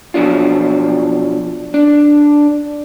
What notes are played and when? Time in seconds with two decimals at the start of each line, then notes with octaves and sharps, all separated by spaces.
0.14 B2 F3 F#3 D4 F4
1.74 D4